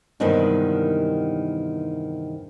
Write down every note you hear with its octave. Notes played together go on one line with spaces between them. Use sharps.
E2 G2 C3 D#3 G#3 B3